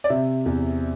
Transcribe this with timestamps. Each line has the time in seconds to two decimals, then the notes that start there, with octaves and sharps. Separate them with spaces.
0.04 D5
0.09 C3 E5
0.46 E2